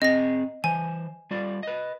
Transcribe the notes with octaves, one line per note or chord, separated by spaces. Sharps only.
C4 G#4 D#5 A#6
E3 C5 G#5
G3 F4 D5
B4 D#5